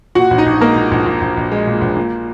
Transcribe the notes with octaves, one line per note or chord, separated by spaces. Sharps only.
A#2 F#4 F#5
A#1
D#4 D#5
A#1
G#3 A#3 A#4
A#2
A#1
A#2
A#1
A#1
G#3
A#2
A#1
A#2